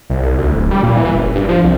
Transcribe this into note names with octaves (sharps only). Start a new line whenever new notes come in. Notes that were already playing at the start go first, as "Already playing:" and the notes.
C2
C2
D2
D1
G3
A#2
E3
F#1
G2
F3
C2